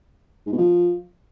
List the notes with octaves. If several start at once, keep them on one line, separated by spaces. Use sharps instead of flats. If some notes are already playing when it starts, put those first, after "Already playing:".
G#2
B2
F3